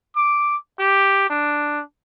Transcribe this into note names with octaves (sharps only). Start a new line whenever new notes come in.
D6
G4
D4